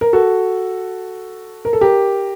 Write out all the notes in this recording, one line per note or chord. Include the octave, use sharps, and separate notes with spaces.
A#4
F#4 A4
A#4
A4
G4 A#4